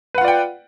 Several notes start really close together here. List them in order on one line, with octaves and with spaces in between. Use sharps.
B4 F#5 F4 D5 G5